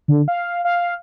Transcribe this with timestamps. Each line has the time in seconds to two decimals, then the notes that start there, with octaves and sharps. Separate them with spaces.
0.08 D3
0.28 F5
0.65 F5